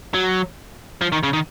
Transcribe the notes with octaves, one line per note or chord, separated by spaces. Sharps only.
F#3
F3
D#3
C#3
D#3